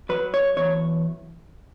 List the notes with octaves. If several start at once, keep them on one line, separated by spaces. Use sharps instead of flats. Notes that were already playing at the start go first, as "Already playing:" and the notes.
F#3 B4
C#5
E2 C#5